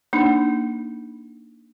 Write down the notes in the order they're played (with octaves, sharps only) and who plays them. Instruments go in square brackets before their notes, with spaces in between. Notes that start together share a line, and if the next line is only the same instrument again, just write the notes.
[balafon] A#3 D4 D#4